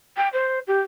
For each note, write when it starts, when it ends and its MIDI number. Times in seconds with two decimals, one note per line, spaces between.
0.17 0.29 79
0.33 0.59 72
0.68 0.80 67